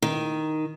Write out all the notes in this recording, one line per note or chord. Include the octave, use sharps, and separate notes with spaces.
D#3